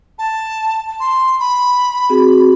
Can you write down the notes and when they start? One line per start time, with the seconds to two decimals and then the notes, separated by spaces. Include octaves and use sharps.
0.19 A5
1.00 C6
1.40 B5
2.09 C4 F#4 G#4